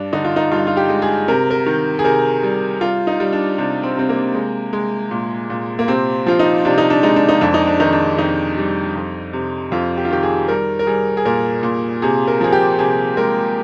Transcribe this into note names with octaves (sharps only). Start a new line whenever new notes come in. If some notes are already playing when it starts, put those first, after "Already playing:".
Already playing: G2 D4
D3 D#4
F4
D#4
G2 F4
F4
G4
G#3
G#4
C3 A#4
A#4
D#3
G#4
C3 A#4
G3
G3 F4
D#4
G3
D4
C3 D4
C4
C3 C4
A#3
G#3
G#3
A#2
A#2
A#3
C3 C4
F3 F4
D#4
C3 D4
D#4
D4
G#3 D#4
D4
D#4
F2 D4
D#4
D4
D#3 D#4
D4
F2 D#4
G3
F2
C3
F2 F4
G4
F4
D#3 G4
G#4
G3 A#4
A#4
G3 G#4
G#4
A#2 A#4
A#2
C3 G#4
A#4
F3 G#4
G4
C3 G#4
G#3 A#4